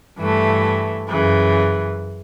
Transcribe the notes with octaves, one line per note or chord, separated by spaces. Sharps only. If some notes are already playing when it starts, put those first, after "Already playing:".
G2 E3 A3
F#2 C#3 E3